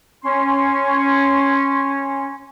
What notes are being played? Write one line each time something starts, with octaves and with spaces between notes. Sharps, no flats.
C#4 C6